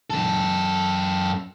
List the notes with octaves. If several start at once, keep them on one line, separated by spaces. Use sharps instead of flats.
F#2 A4